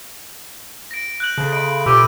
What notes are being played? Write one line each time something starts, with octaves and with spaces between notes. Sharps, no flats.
A#6 D7
F#6 G6 F#7
C#3 A4 C5 A5
E5 B5 C6 D7
A#2 G4 B4 C#6 E6 D#7